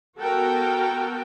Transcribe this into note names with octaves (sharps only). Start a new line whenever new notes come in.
B3 F#4 A4 A#4 G5